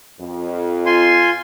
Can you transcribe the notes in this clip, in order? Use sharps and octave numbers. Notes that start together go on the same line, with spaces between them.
F2
F4 G#5 C6